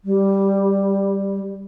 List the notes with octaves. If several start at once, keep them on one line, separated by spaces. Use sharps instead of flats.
G3